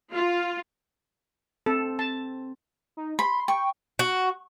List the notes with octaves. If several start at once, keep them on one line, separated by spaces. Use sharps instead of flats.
F4
C4 A4
A5
D#4
B5 C6
G5 C#6
F#4